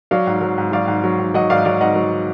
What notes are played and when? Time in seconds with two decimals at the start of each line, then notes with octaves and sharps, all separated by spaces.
0.11 F#3 D5 F5
0.27 G#2
0.41 F#3
0.58 G#2
0.72 F#3 D5 F5
0.88 G#2
1.04 F#3
1.19 G#2
1.34 F#3 D#5 F#5
1.50 G#2 D5 F5
1.65 F#3 D5 F5
1.80 G#2 D#5 F#5
1.96 F#3